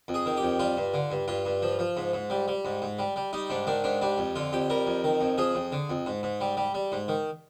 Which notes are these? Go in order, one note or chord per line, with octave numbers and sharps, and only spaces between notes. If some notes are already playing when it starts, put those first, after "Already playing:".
F2
G#4
D#3
G4
F2
G3 F4
G2
D3
G2
G2 F4
G2
F3
F3
G#2
G#2
G3
G3
G#2
G#2
G3
G3
G3 D#4
G#2 D4
D#3 D4
G#2 D4
G3 D4
F2
D3 F4
F2 G4
G3 A#4
F2
D#3
F2
F3 G#4
F2
D3
F2
G#2
G#2
G3
G3
G3
G#2
D#3